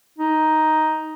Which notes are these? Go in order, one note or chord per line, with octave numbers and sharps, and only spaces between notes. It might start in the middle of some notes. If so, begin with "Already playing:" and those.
D#4